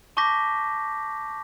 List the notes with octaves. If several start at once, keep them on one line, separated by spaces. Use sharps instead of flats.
A5 C#6 D6 G6 A#6 B6